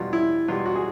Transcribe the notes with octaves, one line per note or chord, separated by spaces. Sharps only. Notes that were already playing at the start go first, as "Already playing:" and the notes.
Already playing: E2 B2 G3 F4
E4
E2 B2 G3 F4
F#4
G#4